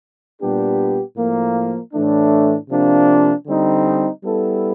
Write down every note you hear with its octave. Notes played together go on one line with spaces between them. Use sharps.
A#2 G3 B3 D4 G4
A2 F3 A#3
A2 E3 A3 D4
C3 F3 A#3 D4
D3 G3 C4 D#4
G3 B3 E4 A4